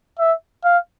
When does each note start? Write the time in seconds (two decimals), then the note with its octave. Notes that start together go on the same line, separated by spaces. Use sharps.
0.19 E5
0.64 F5